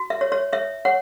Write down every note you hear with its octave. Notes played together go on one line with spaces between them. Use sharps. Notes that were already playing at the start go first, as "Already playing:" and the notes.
Already playing: F#4
E5
C#5
C#5
C#5 E5
C#5 F#5